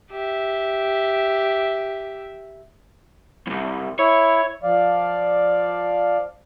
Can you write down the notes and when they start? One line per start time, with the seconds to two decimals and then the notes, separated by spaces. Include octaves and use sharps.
0.12 G4 E5
3.47 C2 F2
3.99 E4 C#5
4.63 F3 D5 F5